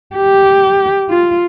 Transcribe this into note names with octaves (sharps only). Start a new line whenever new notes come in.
G4
F4